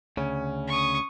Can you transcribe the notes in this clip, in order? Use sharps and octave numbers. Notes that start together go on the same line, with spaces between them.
D2 C#3 C#4
C#6 D#6